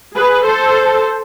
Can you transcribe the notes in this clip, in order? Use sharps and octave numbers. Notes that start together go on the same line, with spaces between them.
G#4 B4
A4 C5